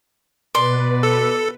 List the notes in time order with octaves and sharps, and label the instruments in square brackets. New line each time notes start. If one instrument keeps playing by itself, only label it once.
[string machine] B2 B4 [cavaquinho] D5 C6
[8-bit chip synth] A4